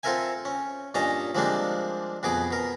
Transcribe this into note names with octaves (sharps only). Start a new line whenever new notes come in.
C4 F4 A4 A#4 E5 G#5
C#4
G2 A#2 C#4 D#5 A5 A#5
F3 G3 G#3 A#3 C4 D4
F2 B2 B3 G#4 D6
B2 A#4